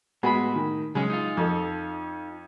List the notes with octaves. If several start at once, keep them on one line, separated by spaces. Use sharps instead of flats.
A2 G#3 B3 F#4 B5
D#3
C#3 F#3 G#3 C#4
D#4 F4
F2 A4